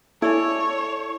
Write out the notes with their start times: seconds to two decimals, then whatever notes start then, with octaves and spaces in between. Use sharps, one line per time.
0.22 E4 A4 C#5 D5 G#5